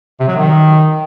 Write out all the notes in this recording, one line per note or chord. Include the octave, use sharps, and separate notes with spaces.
C3
F#3
D#3